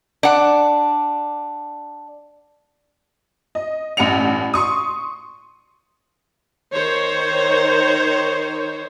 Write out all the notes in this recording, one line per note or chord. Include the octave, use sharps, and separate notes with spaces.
D4 F#5
D#5
A1 G2 F#5 C#7 F7
C6 C#6 D#6
D#3 C5 C#5